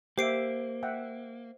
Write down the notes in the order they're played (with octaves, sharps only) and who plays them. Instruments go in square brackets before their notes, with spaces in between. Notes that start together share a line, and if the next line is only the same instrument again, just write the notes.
[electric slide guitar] A#3 [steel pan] G4 E5 [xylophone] C5 C7 D7
[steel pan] E5 F#5 G5